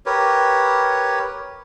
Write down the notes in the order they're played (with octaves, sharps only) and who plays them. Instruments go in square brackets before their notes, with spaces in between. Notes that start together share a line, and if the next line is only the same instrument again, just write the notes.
[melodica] G4 A#4 B4 C#5